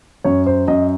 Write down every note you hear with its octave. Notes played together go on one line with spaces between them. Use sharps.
F#2 C#5
C5
F#2 D#5